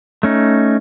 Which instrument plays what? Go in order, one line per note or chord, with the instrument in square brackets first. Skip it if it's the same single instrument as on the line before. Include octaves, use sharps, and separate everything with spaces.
[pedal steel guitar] A3 C#4 D#4